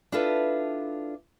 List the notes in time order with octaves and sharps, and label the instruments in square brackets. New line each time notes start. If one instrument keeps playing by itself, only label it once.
[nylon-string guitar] D4 E4 F4 A4 B4